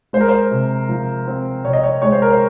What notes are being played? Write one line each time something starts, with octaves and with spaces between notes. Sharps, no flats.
G#3 C5
A#4
C5
C3
F3
C4
C3 C#5
D#5
C#5
G#3 C#5
C5
A#4
C5